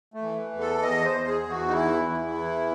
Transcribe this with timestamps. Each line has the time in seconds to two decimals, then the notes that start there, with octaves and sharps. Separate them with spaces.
0.14 A3
0.22 E3
0.53 E2
0.60 A4
0.82 E2 D#5
1.06 C5
1.12 E2
1.28 G#4
1.43 E2
1.50 F#4
1.68 D#4
1.73 E3 E4
2.04 E2
2.33 E3